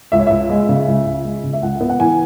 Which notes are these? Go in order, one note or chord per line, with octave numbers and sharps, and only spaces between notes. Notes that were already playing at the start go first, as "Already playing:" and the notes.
C#2 E5
C#5
C#2 E5
G#3
C#3
C#2
C#2
G#3
C#3
E5
C#2 F#5
B3
F#5
E3 G#5